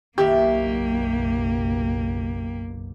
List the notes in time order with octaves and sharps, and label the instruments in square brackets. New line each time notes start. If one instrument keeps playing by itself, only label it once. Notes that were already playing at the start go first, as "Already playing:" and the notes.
[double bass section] F#1 B1 B2 [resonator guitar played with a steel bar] D#3 E4 E5 [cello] A#3 [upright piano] G4